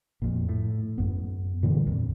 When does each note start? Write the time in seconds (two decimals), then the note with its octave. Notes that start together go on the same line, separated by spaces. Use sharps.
0.22 F2 A#2
0.49 A2
0.98 F#2 B3
1.63 A#2 D3 E3 G3
1.86 C2 F2 A#2